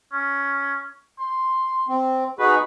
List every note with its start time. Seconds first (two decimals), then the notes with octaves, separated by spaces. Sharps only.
0.13 C#4
1.19 C6
1.88 C4
2.39 D#4 F#4 G#4 B4